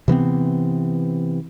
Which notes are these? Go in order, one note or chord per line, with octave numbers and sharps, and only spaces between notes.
C3 E3 B3 C4